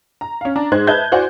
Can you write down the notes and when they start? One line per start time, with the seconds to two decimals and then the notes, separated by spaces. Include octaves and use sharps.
0.21 A#5
0.41 C#4 F5
0.56 D4 A#5
0.72 G#2 G#3 C5 F#6 G#6
0.87 B4 D#5 E5 A5 G6 G#6
1.12 E4 F#4 C5 D5 F#5 G#5